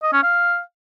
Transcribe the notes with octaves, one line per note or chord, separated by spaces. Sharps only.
D#5
C#4
F5